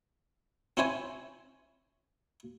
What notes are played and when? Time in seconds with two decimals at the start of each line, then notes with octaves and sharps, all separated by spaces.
0.77 C4 C#4 E4 C5 C#5 G#5